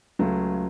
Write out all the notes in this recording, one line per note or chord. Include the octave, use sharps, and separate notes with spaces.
C#2 C#3 F#3 A3